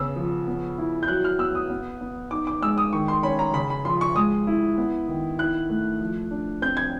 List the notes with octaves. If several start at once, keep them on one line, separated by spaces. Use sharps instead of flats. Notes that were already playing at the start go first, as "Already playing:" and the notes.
Already playing: C#3 B3 E6
F3
B3
E4
G6
F#3 F#6
F6
B3 E6
D#6
B3
B3
D#4 D6
D6
G#3 E6
D#6
D#3 C#6
C6
C#4 B5
A#5
C#3 B5
B5
F3 C6
C#6
G#3 D#6
E4
B3
D#3
E4 F#6
A3
F3
D4
C4 G6
G#6